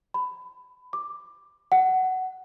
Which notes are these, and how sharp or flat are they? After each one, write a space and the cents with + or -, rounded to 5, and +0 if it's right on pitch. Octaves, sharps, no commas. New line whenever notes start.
B5 +20
D6 +10
F#5 +15